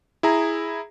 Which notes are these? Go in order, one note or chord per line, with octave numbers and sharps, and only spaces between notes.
E4 G#4 A#5